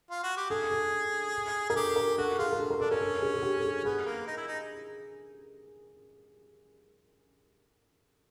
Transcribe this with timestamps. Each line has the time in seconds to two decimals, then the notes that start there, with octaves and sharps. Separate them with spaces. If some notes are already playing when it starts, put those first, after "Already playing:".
0.10 F4
0.23 F#4
0.37 G4
0.50 G#4 A4
0.71 A4
1.69 G#4 A#4
1.76 G4 A4
1.96 A#4
2.18 F#4 A4
2.38 F4 G#4
2.53 A#4
2.59 A4
2.70 A#4
2.80 D4 A4
2.90 C#4 A#4
3.01 A4
3.22 G#4
3.36 G#4
3.43 G4
3.60 A4
3.64 G#4
3.85 B3 G#4
4.06 A#3
4.27 D#4
4.37 E4
4.48 D#4